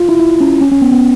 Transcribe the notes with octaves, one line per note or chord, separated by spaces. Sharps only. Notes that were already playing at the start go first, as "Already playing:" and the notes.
Already playing: F4
E4
E4
C#4
C#4
C#4
B3
B3